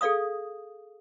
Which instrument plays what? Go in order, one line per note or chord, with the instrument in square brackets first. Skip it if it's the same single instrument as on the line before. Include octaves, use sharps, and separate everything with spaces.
[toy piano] G#4 A4 D5 F5 D#6